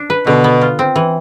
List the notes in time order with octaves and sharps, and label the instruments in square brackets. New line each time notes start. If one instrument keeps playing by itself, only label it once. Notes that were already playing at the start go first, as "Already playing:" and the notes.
Already playing: [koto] D4
B4
[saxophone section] B2 [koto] D3
[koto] B3
F4
C4
E3